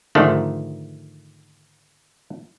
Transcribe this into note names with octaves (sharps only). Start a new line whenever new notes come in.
G#2 D3 D#3 F3 A3